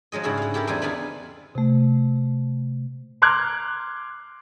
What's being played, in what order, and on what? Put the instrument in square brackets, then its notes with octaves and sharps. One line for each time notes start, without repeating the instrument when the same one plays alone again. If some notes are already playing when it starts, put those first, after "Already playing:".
[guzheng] F3 F#3 G#3 D#5
G#2 C#3 G3 E4 F#4 G#4
F5 F#5
E4 G4 A4 A#4
E2 G3 C4 D#4 C5 G#5
G3 B3 D4 F4 G#4
[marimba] C3 A3
[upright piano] A#5 C6 D6 F6 F#6 G#6